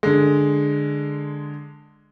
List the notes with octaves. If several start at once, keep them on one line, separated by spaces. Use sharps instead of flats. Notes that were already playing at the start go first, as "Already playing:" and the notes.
D3 G#3